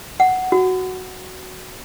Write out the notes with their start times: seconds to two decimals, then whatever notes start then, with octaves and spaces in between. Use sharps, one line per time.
0.20 F#5
0.52 F#4